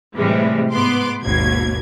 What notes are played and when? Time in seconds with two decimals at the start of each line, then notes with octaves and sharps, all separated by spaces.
0.16 A2 C3 E3 G3 G#3
0.72 G#2 B3 C6 D6
1.23 G#1 D#2 B2 G#6